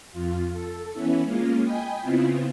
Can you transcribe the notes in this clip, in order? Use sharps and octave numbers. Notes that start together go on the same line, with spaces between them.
F2 F4
A4
E3 B3 C#4 E4
G#3 A#3 C#4 F4
D#5 G5 G#5 B5
C#3 B3 C4 E4 F4